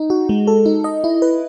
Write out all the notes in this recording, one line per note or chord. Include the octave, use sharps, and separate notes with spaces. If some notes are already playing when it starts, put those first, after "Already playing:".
Already playing: D#4
F#4
G#3
A4
D#4
D#5
E4
B4